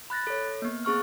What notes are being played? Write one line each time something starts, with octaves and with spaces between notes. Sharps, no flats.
B5 F#6 A6 A#6
A4 C#5
A#3 B3
C4 G#4 C#6 F6